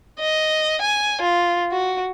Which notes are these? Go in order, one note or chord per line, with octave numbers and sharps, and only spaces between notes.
D#5
G#5
F4
F#4